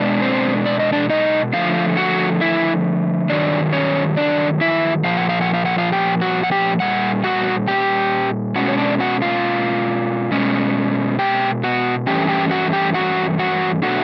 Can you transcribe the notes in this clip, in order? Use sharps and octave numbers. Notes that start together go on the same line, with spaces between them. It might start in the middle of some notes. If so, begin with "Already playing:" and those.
Already playing: B2 G#3 B3 D4
C4 C5
D5
D#5
D4 D5
D#4 D#5
D3 F3 A3 F4 F5
F#4 F#5
E4 E5
G2 D#3 F#3 D4 D5
C#4 C#5
D4 D5
E4 E5
A#2 F3 F5
F#5
F5
F#5
F5
F#5
F4 F5
G4 G5
F#4 F#5
F#5
G4 G5
A#2 G3 F#5
F#4 F#5
G4 G5
B2 G#3 C#4 F#4 F#5
C#5
D4 D5
F#4 F#5
F4 F5
B2 G#3 C#4
G4 G5
F#4 F#5
G2 E3 A3 C#4 G4 G5
G4 G5
F#4 F#5
G4 G5
F#4 F#5
F#4 F#5
B2 F#3 A3 D4 F#4 F#5